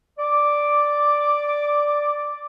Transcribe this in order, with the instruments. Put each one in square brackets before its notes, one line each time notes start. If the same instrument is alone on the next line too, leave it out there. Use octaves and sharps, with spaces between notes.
[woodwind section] D5 D6